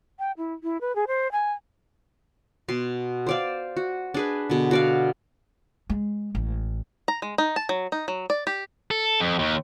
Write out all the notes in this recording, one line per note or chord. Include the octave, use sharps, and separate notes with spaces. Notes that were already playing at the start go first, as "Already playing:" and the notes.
G5
E4
E4
B4
G#4
C5
G#5
B2 C6
C5 D5 F5
F#4
D4 G#4 B4
B2 D3
F#4 D5 F5
G#3
A1
A#5
G#3
D#4
A5
F#3
D#4
F#3
D5
G4
A4
F2
D#2